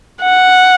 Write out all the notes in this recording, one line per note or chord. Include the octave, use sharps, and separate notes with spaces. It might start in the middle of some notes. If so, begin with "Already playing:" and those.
F#5